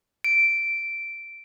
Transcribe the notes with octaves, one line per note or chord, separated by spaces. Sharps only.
D7